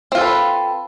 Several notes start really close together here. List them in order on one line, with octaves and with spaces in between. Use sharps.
C4 F4 A4 B4